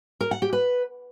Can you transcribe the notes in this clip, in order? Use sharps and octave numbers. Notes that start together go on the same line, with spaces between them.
A#4
F#5
G4
B4